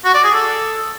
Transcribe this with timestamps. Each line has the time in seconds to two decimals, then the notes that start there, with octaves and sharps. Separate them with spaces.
0.05 F#4
0.14 D5
0.24 G#4
0.33 A4